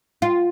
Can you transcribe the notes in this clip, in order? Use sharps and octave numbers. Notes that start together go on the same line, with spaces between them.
F4